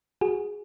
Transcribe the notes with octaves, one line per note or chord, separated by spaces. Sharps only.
F#4 G#4